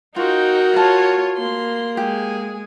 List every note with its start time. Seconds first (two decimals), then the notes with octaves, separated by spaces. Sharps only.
0.16 D#4 F4 F#4 A#4 G5
0.74 F4 G#4 C#5 A5
1.37 A#3 C6
1.97 G#3 G4 G#4